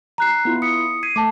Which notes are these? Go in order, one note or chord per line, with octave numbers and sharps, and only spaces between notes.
A#5 F#6 C7
B3 E4 F4
D#6 B6 C#7
G#6 B6 C7 D#7
A3 A5 D6